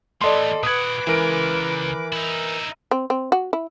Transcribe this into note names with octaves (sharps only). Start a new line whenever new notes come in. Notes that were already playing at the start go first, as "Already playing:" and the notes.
A2 E3 A4 D5 D#5 C6
A#2 B4 F#5 D6 D#6 G#6
C#3 E3 G#3 A#4 D7
D#4 E4
C4
C4
F#4
E4